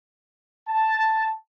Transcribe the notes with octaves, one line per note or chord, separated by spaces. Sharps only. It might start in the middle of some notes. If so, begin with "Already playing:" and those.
A5